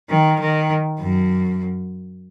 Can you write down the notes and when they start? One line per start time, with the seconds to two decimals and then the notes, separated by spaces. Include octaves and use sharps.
0.10 D#3
0.40 D#3
0.99 F#2